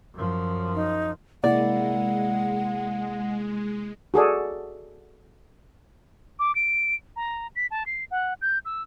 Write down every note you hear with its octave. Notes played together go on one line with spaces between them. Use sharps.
F#2 F3
D#4
C3 G#3 A#3 E4 D5 F#5
F#4 G#4 A4 D5
D6
D7
A#5
B6
A5
C7
F#5
G6
E6